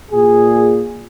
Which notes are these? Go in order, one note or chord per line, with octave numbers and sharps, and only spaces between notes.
A#2 G#4